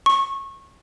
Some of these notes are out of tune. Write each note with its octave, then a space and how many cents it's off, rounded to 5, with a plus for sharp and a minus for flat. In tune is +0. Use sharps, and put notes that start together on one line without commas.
C#6 -25